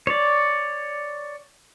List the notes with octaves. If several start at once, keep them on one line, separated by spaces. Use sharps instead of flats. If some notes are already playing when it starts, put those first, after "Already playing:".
C#5 D5